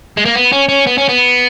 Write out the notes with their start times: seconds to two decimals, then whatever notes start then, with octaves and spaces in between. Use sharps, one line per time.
0.17 G#3
0.25 A#3
0.35 B3
0.52 C#4
0.69 C#4
0.87 B3
0.98 C#4
1.09 B3